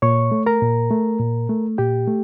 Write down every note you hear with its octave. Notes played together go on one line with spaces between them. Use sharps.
A#2 C#5 C#6
A3
A#4 A#5
A#2
A3
A#2
A3
A#2 G4 G5
A3